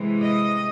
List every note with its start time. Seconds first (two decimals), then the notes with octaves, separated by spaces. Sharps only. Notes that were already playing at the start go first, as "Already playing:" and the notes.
Already playing: C3 E3 G#3 C4
0.22 D#5